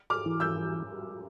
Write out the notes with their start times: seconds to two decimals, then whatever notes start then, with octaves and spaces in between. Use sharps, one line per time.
0.10 D6 F6
0.26 E3
0.40 E6 G6